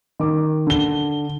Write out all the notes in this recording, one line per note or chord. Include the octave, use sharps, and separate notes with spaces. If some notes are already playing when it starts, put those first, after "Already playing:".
D#3 D6
D3 G7